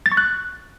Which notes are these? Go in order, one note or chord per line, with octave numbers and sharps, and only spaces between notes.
A6
C#6
F#6